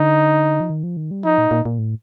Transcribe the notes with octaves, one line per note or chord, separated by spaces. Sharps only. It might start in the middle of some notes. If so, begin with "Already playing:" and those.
Already playing: D3 D#4
F3
D#3
F3
D#3
G3
F3 D#4
A#2
A#2
A#2
A2